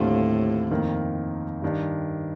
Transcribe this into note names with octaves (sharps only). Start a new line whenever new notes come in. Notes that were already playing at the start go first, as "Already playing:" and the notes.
Already playing: D#2 A2 D3 G3 C4 F4
F2 D#3 A#3
G2 D#3 G3 D4